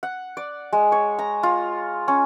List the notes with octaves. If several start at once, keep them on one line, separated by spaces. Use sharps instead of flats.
F#5
D5
G#3
C#5
A#5
F4
C#4